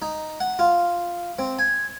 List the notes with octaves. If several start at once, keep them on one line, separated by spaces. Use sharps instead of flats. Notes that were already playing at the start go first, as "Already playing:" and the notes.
D#4
F#5
F4
C4
G#5